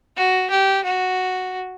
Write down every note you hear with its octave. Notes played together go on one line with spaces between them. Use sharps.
F#4
G4
F#4